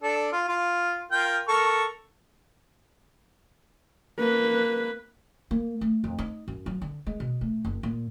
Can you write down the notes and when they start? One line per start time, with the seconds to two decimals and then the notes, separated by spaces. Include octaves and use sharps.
0.03 D4 A4
0.33 F4
0.49 F4
1.12 F4 A#4 G5
1.48 A4 A#4 C#6
4.19 A#3 B4
5.51 A#3
5.81 A3
6.04 F2
6.19 D#4
6.48 F#2
6.66 F#3
6.82 D3
7.06 G#3
7.20 B2
7.41 A3
7.65 F#1
7.83 A#2